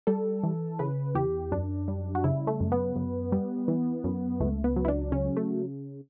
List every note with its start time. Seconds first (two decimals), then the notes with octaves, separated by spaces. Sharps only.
0.07 G3 A4
0.43 E3
0.79 C#3 B4
1.15 E2 G4
1.52 F#2 D4
1.88 G3
2.15 F#4
2.24 C#3 E4
2.47 A3
2.60 F#2
2.72 B3
2.96 F#2
3.32 G3
3.68 E3
4.04 F#2
4.40 C#2 A3
4.64 B3
4.76 F#3
4.85 E4
4.88 D4
5.12 C#3 C#4
5.37 A3